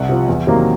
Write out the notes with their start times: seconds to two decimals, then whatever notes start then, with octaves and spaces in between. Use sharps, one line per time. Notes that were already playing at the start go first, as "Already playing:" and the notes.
Already playing: C2 F#5
0.09 C3 F3
0.28 E2
0.47 C3 D#3 F#3 A#3